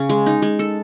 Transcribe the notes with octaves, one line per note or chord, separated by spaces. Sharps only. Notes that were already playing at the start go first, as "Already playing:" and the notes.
Already playing: C#3 C#4
G#3
D#4
G#3
A4